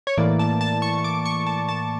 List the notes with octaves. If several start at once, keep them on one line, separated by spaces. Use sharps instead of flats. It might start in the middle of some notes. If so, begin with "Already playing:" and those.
C#5
A2 E3 A#3 D5
A5
A5
C#6
D6
C#6
A5
A5